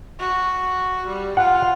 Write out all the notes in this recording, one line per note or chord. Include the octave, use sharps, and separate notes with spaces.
F#4
G3
F4 F#5